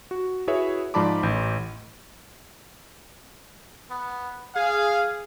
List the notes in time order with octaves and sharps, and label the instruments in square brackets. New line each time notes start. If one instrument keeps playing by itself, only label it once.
[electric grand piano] F#4
E4 F#4 G#4 B4 C#5 E5
G#2 F3 D5 A5 B5 D6
A1 G6
[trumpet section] B3
[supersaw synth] G#4 [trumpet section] F5